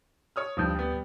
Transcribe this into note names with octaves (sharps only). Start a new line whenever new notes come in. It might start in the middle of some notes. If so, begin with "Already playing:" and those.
C#5 D#6 F6
D2 G2 F3 D#6 G6
G3 B3